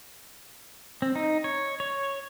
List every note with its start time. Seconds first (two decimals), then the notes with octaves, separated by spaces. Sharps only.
1.02 C4
1.15 D#4
1.44 C#5
1.80 C#5